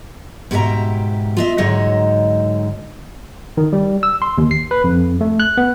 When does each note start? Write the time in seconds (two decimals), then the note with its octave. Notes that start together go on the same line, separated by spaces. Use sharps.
0.51 G#2 B2 G4 G#4 E5 A#5
1.37 F4 D#5 E5
1.58 G#2 D3 F#3 D#4 C#5 D#5
3.57 D#3
3.73 G3
4.03 E6
4.22 C6
4.38 D#2
4.51 C7
4.71 B4
4.84 F2
5.21 A3
5.40 F#6
5.57 B3